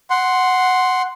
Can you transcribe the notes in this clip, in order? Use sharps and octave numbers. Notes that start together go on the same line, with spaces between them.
F#5 C6